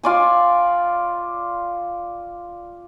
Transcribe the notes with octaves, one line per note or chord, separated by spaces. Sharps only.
F4 D5 G#5